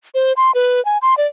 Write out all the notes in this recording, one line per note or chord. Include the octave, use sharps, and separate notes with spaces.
C5
C6
B4
G#5
C6
D5